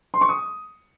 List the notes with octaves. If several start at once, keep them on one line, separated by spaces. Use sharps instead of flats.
C6
C#6
D#6